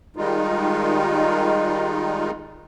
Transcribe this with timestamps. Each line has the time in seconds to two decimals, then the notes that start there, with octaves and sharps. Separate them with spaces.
0.16 D#3 G3 G#3 D#4 F4